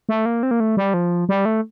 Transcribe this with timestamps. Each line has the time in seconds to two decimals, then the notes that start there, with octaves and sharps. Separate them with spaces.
0.09 A3
0.26 A#3
0.43 C4
0.51 A#3
0.60 A3
0.77 G3
0.94 F3
1.29 G3
1.45 A3